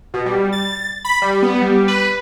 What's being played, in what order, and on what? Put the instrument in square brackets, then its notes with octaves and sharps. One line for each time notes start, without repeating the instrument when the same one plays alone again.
[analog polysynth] B2
G3
A6
B5
G3
B3
G3
B4